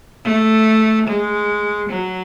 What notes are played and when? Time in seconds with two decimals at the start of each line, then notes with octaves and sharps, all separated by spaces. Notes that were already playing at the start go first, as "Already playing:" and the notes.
0.24 A3
1.07 G#3
1.89 F#3